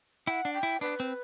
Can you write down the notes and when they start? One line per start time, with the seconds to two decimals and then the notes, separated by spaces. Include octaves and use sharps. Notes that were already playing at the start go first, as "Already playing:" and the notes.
0.27 E4 F#5 G5
0.45 D4
0.54 G5
0.63 E4
0.81 D4 B4
1.00 C4